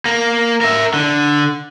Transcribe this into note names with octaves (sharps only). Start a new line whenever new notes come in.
A#3
A#4 E5
D3